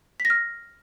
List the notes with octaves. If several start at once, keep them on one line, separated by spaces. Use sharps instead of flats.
B6
A#6
F6